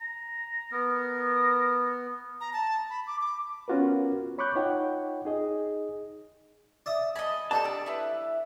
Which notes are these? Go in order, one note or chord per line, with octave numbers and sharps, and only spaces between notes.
A#5
B3 A#4
A#5
A5
B5
D6
D6
B3 C#4 F4 F#4 A#4 B4
C#5 B5 C#6 D6 F#6 G6
D#4 F4 C#5 F#5 G5
D#4 G#4 D#5
D5 E5 D#6
D#5 G#5 A5 B5
D4 G4 A4 A5
D5 E6
E4 B4